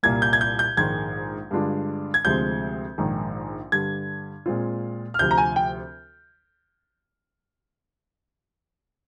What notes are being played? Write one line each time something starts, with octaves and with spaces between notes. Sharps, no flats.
C2 A#2 G3 A#3 G#6
G6
G#6
G6
G6
A#1 G#2 D#3 G#3 G#6
G2 D3 G#3 D4 F4
G#6
D2 C3 F3 G#3 C4 G6
A#1 G#2 D#3
G2 D3 G3 G#6
A#2 G#3 C4 F4
F6
D2 C3 F3 G6
A#5
G#5
G5